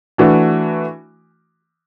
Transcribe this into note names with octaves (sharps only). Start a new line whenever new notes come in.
E3 A3 D4 F#4